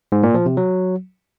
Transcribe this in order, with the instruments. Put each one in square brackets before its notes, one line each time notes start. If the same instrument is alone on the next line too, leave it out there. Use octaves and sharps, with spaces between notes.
[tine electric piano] G#2
A#2
F3
C3
F#3